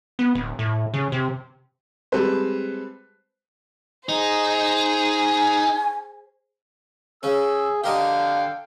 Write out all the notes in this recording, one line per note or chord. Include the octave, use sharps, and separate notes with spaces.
B3
D1
A2
C#3
C3
G3 G#3 C4 A4 B4 C5
D#4 G#4 C5
G#5
C#3 C#4 G#4 E6
D3 G4 A#4 D#5 F5 G5